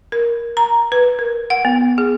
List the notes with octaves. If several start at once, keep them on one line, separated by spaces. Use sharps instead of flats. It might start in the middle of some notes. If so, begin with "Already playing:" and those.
A#4
A#5
B4
A#4
F#5
B3
G#4